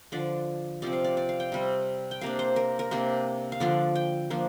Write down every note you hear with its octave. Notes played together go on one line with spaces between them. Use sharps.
D3 F3 D4 D5
C3 F3 C4 D5
F5
D5
D5
F5
G5
C3 G3 C4
G5
C3 A#3 D4 F5
C5
A#4
A#4
C3 A#3 D4
F5
D3 F3 D4 D5
G5
F3 A#3 D4